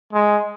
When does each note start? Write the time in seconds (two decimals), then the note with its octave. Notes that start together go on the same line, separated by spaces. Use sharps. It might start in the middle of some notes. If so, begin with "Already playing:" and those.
0.13 G#3